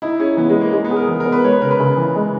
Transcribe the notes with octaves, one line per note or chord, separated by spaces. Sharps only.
D#4 E4
C#4 G#4
E3 B3
G#3
B3
A#3
G#3 D#4
B3
G#4
A#4
E3
A#4
B3
B4
G#3 C#5
B4
C#3 A#4
B4
C#3
E3
G#3